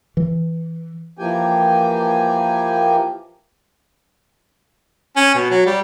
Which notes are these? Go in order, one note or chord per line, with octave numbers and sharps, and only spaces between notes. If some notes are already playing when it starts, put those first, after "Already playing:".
E3
E3 F3 A#3 G4 G5 G#5
C#4
B2
F#3
G3